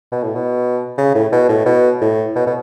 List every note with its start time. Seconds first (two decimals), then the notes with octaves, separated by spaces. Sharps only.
0.12 B2
0.23 A2
0.35 B2
0.98 C#3
1.15 A2
1.32 B2
1.49 A2
1.66 B2
2.01 A2
2.36 B2
2.47 B2